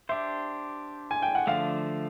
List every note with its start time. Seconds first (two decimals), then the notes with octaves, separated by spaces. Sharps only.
0.09 D4 G4 C5 E5
1.11 G#5
1.22 G5
1.35 F#5
1.47 D3 F3 A3 D4 F5